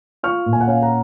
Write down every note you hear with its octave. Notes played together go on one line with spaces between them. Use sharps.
F4 C#6 F6
A#2
G#5
F#5
C#4 F5 G#5
F#5 A#5